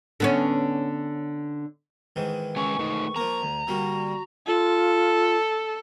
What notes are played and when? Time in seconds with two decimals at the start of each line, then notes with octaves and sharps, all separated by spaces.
0.20 D3 B3 C#4
2.16 G#2 D#3 E3
2.56 G#3 C#4 G#5 C#6
2.79 A3 D#4
3.16 F3 A#3 A#5
3.42 D2
3.67 D3 G3 A#3 F#4
4.47 F4 A4